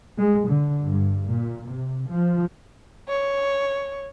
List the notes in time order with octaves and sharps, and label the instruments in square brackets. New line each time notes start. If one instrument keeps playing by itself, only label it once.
[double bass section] G#3
D3
G2
A#2
C3
F3
[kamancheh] C#5